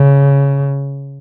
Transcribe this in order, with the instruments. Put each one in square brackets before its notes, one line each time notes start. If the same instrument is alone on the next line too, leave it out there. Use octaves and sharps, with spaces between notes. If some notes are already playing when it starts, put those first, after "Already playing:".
Already playing: [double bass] C#3